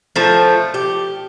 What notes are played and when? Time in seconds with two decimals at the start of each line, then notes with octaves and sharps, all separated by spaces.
0.16 F3 A3
0.74 G4